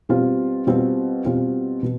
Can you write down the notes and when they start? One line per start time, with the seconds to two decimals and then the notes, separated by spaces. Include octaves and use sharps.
0.09 B2 G3 C4 F4
0.67 B2 G3 C4 F4
1.25 B2 G3 C4 F4
1.83 B2